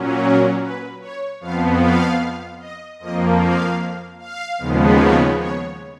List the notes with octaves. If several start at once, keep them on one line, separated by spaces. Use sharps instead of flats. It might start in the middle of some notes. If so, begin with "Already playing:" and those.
Already playing: A#2 F#3 C#4
A#4
B4
C#5
F2 F3 B3 F5
F5
D#5
F2 F3 A#3 D#5
F5
F5
D#2 C#3 F3 G#3 B3
C#5
C#5